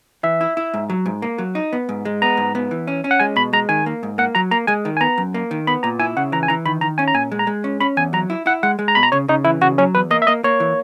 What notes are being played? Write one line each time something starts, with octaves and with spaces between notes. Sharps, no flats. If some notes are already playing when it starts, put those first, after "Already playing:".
E3 E5
E4
E4
G#2
F#3
G#2
A#3
F#3
D#4
B3
G#2
G#3
B3 A#5
G#2
B3
E3
C#4
C#4
F#5
G#3 G#5
B2 B5
G#3 A#5
D#3 G#5
A#3
G#2
A#3 F#5
F#3 A#5
A#3 A#5
G#3 G#5
D#3
G#5
B3 A#5
F#2
A#3
D#3
B3 B5
A#2 A#5
E4 G#5
C#3 F#5
E3 A#5
G#5
E3 A#5
D#3 B5
D#3 A#5
C#4 G#5
A#5
A#2 G#5
G#3
A#5
G#3
C#4
C#4 B5
E2 G#5
F#3 A#5
E4
E4 F#5
G#3 F#5
G#3
A#5
B2 B5
A#5
C#3 C#5
C#3 D#4
E3 E4
C#3 F#4
F#3 C#4
E2 B4
A#3 D#5
E5
A#3 D#5
A#3 C#5
E3